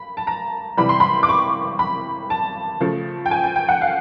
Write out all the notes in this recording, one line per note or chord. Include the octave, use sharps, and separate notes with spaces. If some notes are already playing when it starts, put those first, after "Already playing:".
Already playing: B5
A5
A#5
C3 E3 G3 B5
C6
B5
D6
C#6
B5
A5
C#3 F3 A3
G5
G#5
G5
G5
F#5
F5